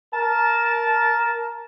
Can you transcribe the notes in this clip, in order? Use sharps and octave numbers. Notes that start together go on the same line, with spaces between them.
A#4 A5